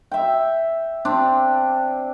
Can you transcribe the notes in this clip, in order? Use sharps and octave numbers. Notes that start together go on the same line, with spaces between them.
E5 G5
C4 D4 D5